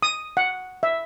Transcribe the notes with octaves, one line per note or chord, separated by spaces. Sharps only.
D#6
F#5
E5